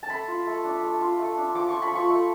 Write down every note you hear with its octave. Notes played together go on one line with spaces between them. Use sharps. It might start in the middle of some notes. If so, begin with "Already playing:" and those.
A5
A3 B5
F4
A3
D4
A3
F4
A3
D4
F3 D6
F4 C#6
B5
F3 C#6
A3